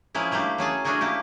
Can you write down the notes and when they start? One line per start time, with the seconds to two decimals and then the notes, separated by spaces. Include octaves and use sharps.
0.15 F3 G#3 A#3 C#4 E4
0.31 G3 A3 A#3 D4 G4
0.58 F#3 C#4 G#4 A5
0.84 A3 C#4 D4 F#4 G#4 A#4
1.01 A#3 E4 G4